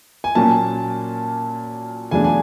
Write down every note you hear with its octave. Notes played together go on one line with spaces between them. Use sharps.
G#5
A#2 F#3 A#3 C#4 A5
E2 C#3 F#3 A3 D4 G#5
G#5